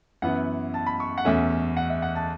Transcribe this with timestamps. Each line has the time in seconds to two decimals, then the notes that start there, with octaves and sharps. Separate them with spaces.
0.22 F#2 E3 B3 E4 F#5
0.74 A5
0.86 B5
1.00 C#6
1.18 F#5
1.25 E2 B2 A3 C#4 E5
1.77 F#5
1.90 E5
2.02 F#5
2.15 A5